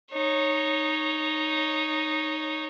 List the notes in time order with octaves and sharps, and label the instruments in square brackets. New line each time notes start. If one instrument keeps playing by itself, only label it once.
[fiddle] D#4 C#5